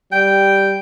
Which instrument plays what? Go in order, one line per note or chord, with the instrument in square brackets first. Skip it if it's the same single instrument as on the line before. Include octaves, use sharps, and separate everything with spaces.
[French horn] G3 [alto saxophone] G5